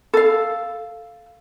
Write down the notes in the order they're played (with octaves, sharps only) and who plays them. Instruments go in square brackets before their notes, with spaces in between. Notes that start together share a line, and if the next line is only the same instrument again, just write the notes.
[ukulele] A4 F5